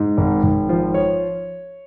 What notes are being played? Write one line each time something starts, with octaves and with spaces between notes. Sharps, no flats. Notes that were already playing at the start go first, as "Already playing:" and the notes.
Already playing: G#2
G#1
G#1
F3
C#5